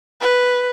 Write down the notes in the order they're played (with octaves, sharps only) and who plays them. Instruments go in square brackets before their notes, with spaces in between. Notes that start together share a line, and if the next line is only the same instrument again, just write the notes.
[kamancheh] B4